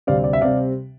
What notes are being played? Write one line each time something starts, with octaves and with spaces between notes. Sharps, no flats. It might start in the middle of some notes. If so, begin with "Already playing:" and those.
D2 C3 G3 C4 D5 F5
D5
E5
C3 G3 C4 D5 F5